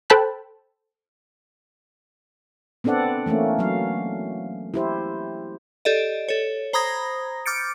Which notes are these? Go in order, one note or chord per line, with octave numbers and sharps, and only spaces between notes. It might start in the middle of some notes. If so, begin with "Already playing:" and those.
A4 C5 G5 A5 B5 F#6
B3 C4 D4 A4 D5 F#5
E3 A3 A#3 C#4
F#3 F5
E4 G4 C5
G4 A4 D5 D#5
A4 C#5
C5 A#5 B5 D#6 G#6 A#6
D6 F6 G6 A6 C#7 D7